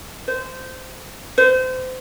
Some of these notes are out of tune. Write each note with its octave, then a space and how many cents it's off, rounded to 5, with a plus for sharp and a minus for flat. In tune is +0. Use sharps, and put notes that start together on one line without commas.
C5 -20
C5 -30